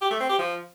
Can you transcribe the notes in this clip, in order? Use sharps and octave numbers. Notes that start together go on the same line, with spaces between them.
G4
A3
C4
G4
F3